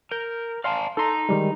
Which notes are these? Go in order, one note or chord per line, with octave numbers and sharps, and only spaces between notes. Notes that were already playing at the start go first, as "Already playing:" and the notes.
A#4 G6
D5 F5 G#5 A5 C6
D#4 A4 A#5 C6
D#3 G3 G#3